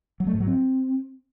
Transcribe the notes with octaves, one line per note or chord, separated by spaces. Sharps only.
F#3
A3
G#2
F#3
C4